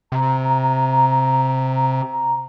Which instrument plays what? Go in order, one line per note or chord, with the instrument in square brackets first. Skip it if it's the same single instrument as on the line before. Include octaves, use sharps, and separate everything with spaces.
[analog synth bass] C3 [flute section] A#5